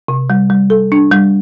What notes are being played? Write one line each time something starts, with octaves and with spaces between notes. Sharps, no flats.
C3
G3
G3
A4
D4
G3